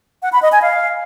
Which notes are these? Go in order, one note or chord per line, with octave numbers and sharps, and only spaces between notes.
F#5
B5
D#5
G#5
F5